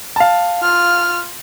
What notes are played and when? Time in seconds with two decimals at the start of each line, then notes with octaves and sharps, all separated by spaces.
0.16 F5 A5
0.59 F4 F6